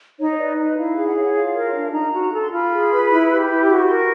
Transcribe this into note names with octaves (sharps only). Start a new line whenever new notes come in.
D#4 C#5
C#5
B4 D5
D#4 D#5
E4 F5
G#4
F#5
C#5 F5
F#5
F4 F5
A#4
D4
D#4 A#5
F#4
A4
C6
F4 B5
G#4
B4
E4
G4
E4
F#4 D6
C#6
A#4 C6
C#6